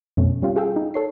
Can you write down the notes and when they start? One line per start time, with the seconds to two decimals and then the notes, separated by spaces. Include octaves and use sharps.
0.17 F2 B2 A3 C#4
0.42 G3 C#4 F4 G4
0.56 F4 G#4 A4 F5 G5 E6
0.76 D#4
0.94 A4 C#5 C7